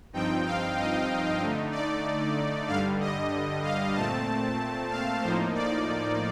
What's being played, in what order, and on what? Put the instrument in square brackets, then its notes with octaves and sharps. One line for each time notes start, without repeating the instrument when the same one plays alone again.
[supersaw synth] G2 F3 C4 D#4 G5
F5
D#5
D3 A3 D#4
D5
G2 D3 G3 F5
D#5
F5
A#2 A3 C4 A5
F5
A2 F3 A#3 D#4 C5
D5